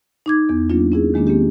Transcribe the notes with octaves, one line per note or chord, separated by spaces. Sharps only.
D#4 D6 G#6
E2 B3
F#3 A#3 C#4 D4 F4
C#4 E4 G#4
D#3 G#3 A#3 C#4 D4
A#3 C4 C#4 G4